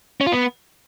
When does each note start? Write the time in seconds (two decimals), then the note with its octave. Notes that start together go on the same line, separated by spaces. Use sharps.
0.21 C#4
0.26 F4
0.32 B3